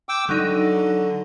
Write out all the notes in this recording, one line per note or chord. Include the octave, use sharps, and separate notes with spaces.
G5 D6 E6
D3 F#3 D#4